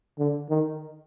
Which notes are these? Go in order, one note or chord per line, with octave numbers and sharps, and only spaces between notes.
D3
D#3